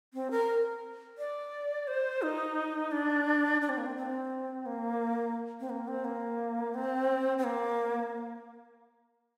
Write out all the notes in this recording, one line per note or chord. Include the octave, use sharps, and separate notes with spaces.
C4
A#4
D5
C5
D#4
D4
D4
C4
A#3
C4
C4
A#3
C4
A#3
C4
A#3
C4
C4
A#3